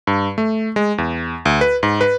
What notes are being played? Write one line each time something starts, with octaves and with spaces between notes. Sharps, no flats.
G2
A3
G#3
E2
D2
B4
G#2
B4